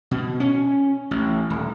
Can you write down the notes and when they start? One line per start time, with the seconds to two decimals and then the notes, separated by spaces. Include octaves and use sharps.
0.11 B2
0.40 C#4
1.11 A1
1.50 D#1